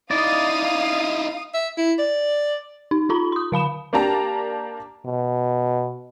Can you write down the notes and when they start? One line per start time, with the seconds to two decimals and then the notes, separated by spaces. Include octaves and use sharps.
0.11 D#4 E4 D5 F5 D#6
1.54 E5
1.78 E4
1.99 D5
2.91 D#4
3.09 D#4 F4 A#5 B5
3.32 C6 D#6
3.52 D3 F5 B5 E7
3.93 A#3 D4 G4 A5 A#5
5.05 B2